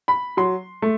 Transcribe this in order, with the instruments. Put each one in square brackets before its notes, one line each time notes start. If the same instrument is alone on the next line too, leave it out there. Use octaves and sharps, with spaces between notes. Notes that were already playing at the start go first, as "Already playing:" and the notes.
[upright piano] B5
F#3 C6
A3